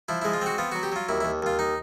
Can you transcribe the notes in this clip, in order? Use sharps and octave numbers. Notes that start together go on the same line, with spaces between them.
F3 E4
G#3 E4
F4
C4 F#4
B3 F4
F#3 F#4
G4
F#3 F4
D#2 E4
E4
D#2
D#2 F4
D#4